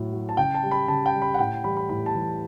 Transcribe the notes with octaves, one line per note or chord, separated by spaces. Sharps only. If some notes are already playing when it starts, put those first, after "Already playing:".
Already playing: A2 F#3
F#3
A5
C#3 G5
A5
G3
B5
C#3 A5
G5
G3
B5
F#5
A2 G5
E3 G3 B5
B5
A2 B5
A5
E3 G3